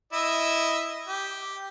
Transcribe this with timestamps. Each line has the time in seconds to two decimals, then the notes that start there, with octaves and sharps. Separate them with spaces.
0.13 E4 D#5 E5
1.08 G4